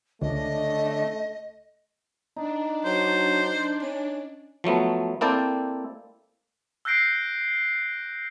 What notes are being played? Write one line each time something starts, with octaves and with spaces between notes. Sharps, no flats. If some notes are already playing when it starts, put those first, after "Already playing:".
C#2 D3 A3 C#4 D4 D#5
D4 D#4
F#3 C5
C#4
F3 F#3 A3 B3
A#3 C4 E4 A4 D5 G5
E6 F#6 G6 A#6 C7 D7